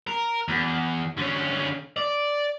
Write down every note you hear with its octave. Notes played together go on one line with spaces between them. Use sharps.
A#4
E2
D3 C#4
D5